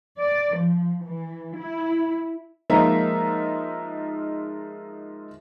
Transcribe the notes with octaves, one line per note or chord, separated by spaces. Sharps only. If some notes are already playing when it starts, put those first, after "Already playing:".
D5
F3
E3
E4
F3 G#3 A#3 D#4 F4 E5